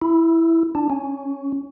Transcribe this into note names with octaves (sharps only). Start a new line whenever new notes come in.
E4
D4
C#4